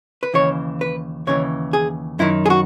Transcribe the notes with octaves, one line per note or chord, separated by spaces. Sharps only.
B4
D#2 C#3 E3 C#5
B4
D#2 C#3 E3 C#5
G#4
F#2 D#3 E4
G#4
F#4